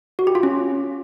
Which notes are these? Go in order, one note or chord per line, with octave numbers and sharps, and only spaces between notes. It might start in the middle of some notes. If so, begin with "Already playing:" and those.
F#4
G4
F4
C#4